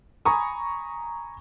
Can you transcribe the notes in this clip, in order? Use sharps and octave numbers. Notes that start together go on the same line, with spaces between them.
G#5 A#5 B5 C#6 D#6